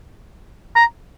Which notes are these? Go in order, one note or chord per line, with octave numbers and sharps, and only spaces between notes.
A#5